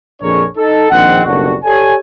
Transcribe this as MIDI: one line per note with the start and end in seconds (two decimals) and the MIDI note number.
0.21 0.43 34
0.21 0.43 41
0.21 0.43 62
0.21 0.43 68
0.21 0.43 70
0.21 0.43 73
0.57 0.87 63
0.57 0.87 69
0.90 1.21 34
0.90 1.21 51
0.90 1.21 60
0.90 1.21 78
1.25 1.54 30
1.25 1.54 35
1.25 1.54 55
1.25 1.54 62
1.25 1.54 66
1.64 1.94 67
1.64 1.94 69
1.64 1.94 73
1.64 1.94 74
1.64 1.94 80